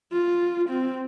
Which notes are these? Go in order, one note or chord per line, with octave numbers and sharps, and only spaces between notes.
F4
C4